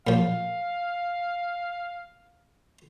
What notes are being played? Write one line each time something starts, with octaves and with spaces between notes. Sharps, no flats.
A#2 F3 F5